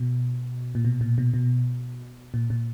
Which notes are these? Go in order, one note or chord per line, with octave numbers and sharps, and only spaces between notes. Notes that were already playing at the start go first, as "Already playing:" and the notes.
Already playing: B2
A#2
B2
A#2
B2
B2
A#2
A#2